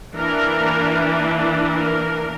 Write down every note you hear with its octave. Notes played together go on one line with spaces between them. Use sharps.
E3 A#3 D4 A#4
A#4